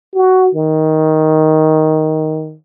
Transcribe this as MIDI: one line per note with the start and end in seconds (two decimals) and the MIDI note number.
0.15 0.49 66
0.55 2.55 51